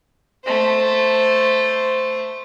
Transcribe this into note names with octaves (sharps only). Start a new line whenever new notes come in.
A3 C5